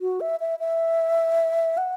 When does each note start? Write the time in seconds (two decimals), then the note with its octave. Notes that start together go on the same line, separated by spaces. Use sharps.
0.01 F#4
0.21 E5
0.40 E5
0.59 E5
1.77 F#5